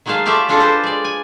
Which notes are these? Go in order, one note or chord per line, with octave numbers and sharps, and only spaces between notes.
D#3 F#3 G#3 D#4 F5 A5
A3 F4 G4 D5 E5 A5
G#3 D4 F4 A4 F#5 A5
G4 A4 B4 C5
G#3 D5
G#5